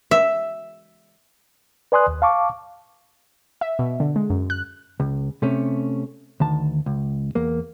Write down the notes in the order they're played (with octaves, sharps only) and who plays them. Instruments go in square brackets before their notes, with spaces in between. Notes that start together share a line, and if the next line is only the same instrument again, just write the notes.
[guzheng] E5
[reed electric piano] B4 D5 G#5 C6 D#6 F#6
D#2
F5 A5 C#6 D6
[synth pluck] E5
B2
D3
G#3
F#2
F#6
[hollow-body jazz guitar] C#2
C3 A3 C#4
D2 D#3 A5
C#2
E2 A#3